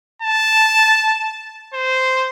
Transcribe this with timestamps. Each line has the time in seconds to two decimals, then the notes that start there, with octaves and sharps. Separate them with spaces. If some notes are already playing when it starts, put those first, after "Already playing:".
0.22 A5
1.74 C5